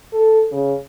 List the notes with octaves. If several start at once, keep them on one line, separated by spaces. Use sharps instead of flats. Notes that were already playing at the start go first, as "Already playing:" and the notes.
A4
C#3